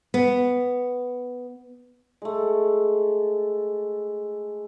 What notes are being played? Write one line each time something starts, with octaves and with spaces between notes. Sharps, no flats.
B3
G#3 A3